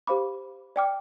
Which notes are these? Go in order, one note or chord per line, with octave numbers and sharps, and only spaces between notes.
G4 C5 F5 B5 D6
D5 G5 D6 F6